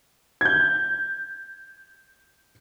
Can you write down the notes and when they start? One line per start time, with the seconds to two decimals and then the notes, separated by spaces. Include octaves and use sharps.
0.41 G6 G#6